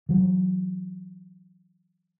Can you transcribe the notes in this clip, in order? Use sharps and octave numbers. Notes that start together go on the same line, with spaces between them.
E3 F#3